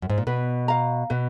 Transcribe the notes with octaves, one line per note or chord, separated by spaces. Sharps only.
F#2
G#2
A#2
B2 B4
F5 A#5
B2 B4